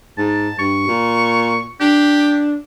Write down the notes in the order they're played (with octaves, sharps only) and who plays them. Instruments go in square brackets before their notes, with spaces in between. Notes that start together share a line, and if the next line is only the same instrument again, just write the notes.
[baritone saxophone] G#2 [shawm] A5
[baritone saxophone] G2 [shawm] C#6
[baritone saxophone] A#2
[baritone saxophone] D4 [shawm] G4